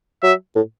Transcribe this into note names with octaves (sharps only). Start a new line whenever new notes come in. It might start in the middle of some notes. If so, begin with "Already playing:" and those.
F#3 E5
A2